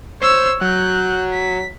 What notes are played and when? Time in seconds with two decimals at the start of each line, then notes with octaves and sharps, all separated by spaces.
0.22 C5 C#5 E6
0.61 F#3 F#6 G6
1.32 B6